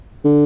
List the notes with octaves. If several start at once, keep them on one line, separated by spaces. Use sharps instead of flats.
D3